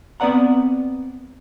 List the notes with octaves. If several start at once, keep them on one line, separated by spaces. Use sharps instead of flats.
B3 C4 B4 D5 F#5 A#5